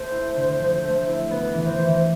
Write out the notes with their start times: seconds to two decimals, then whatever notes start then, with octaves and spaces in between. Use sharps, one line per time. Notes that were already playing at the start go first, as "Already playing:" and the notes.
Already playing: A3 C5
0.12 E4
0.36 D3
0.60 F3
0.84 A3
1.07 E4
1.31 B3 B4
1.54 E3
1.66 C5
1.78 E3